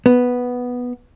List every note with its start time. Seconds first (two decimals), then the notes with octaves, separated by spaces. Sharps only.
0.06 B3